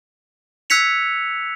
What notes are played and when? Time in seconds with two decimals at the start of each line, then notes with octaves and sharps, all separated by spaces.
0.70 E6 F#6 G#6 B6 C#7 F7